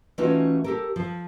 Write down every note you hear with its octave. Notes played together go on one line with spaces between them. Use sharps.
E3 A3 C#4 D#4 F4 F#4
G4 A4 A#4
F3